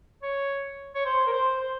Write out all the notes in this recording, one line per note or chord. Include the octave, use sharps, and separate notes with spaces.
C#5
C#5
C5
A#4
C5
C5